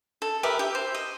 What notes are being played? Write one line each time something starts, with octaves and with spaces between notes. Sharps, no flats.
A4
G4 A#4 B4 E5
G4
C5
D#5